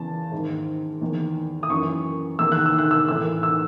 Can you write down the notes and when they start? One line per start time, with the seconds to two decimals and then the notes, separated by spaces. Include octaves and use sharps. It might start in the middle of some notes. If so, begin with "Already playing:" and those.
Already playing: E2 C#3 E3 A5
0.32 G#2 D#3
1.01 E2 D#3
1.63 D#6
1.70 F#2 E3 C#6
2.39 E2 D#3 E6
2.52 F#6
2.66 E6
2.79 F#6
2.91 E6
3.08 A2 E3 E6
3.43 E6